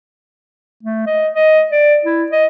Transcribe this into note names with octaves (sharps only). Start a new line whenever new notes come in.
A3
D#5
D#5
D5
E4
D#5